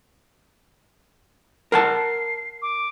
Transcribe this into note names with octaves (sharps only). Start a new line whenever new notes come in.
A#4 F#5 A5 C7
D6